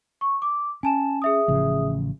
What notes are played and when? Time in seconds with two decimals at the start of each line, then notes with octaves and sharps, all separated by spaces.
0.21 C#6
0.42 D6
0.83 C#4 G#5 A5 E7
1.22 G#4 E5 D#6
1.48 A1 C#3 F3